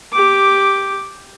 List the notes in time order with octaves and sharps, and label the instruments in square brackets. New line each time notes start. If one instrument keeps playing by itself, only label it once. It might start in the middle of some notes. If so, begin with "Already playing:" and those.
[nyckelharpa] G4 D6